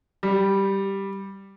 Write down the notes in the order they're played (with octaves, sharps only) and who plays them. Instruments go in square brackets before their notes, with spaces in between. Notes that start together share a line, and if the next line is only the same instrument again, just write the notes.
[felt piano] G3